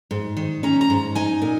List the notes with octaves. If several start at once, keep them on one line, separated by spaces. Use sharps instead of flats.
G#2
D#3
C#4 A#5
A#5
G#2
D#4 G#5
A#2